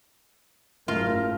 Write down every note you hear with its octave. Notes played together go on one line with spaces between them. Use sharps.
F#1 G#2 A3 F4 A#4